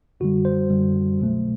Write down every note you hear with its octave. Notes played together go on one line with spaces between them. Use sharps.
F#2 D3 G3 F#4
C5
F#2 D3 G3
C2 B2 F#3 A3